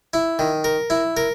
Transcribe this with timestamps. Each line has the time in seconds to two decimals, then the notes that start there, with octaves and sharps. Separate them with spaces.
0.14 E4
0.39 D#3
0.64 A#4
0.90 E4
1.17 A#4